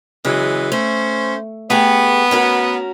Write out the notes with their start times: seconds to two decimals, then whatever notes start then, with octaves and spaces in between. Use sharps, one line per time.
0.25 C#3 E3 F#3 G#3
0.72 A3 C#4 C5
1.70 A3 B3 G4 G#4
2.31 C#4 F#4 A#4